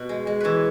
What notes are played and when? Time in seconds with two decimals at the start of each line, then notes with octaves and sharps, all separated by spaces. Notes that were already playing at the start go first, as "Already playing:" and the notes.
Already playing: B2
0.09 G#3
0.27 G#3
0.40 E3 B4 C#5